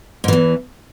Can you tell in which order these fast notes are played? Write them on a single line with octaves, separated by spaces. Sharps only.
G#2 E3 E2